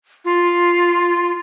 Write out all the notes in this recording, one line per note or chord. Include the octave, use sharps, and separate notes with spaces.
F4